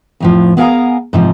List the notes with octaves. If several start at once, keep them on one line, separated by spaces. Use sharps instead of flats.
F2 A2 F3
B3 G#4 A#4 F5 G#5 A#5
G#2 C3 F3